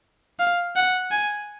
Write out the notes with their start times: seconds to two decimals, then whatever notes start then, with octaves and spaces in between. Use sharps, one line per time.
0.40 F5
0.76 F#5
1.11 G#5